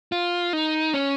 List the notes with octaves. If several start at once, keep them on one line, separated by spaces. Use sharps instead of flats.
F4
D#4
C#4